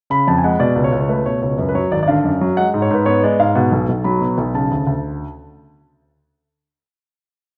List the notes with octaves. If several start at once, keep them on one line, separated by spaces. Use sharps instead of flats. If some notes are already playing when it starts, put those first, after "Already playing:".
C#3 B5
F2 A5
G#5
G#3 F#5
B2 D5
C#2
C#5
C#2
C#5
A3 B4
B2 C#5
C#2 C#5
F#2 B4
B4
F#3 C#5
G#1 D5
D5
D3 F5
F#2
F#3
G#3 F#5
G#2
C#5
G#2 B4
B3 C#5
G#3 D5
G#2 F5
B2 F#5
B1
B1
F#3 B5
B2
B1
C#3 A5
D2
D2